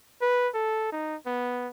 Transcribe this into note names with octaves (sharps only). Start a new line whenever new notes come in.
B4
A4
D#4
B3